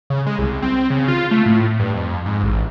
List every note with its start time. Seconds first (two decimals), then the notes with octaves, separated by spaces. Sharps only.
0.10 C#3
0.26 G#3
0.39 C2
0.62 C4
0.90 C#3
1.08 F4
1.31 A3
1.46 A2
1.79 G2
1.94 F2
2.26 G#2
2.43 A1